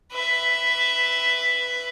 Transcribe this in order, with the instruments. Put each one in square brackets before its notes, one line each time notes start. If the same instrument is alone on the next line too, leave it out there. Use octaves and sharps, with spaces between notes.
[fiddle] B4 E5